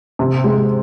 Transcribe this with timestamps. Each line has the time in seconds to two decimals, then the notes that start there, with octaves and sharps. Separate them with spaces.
0.19 C3
0.44 G#3